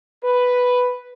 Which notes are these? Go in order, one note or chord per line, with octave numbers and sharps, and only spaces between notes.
B4